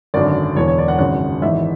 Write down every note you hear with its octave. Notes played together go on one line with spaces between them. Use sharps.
G#1 F#2 D3 D5
E1 E2 D3 C#5
C#5
D5
F#5
G#1 F#2 C#3 F#5
G#1 G#2 E3 E5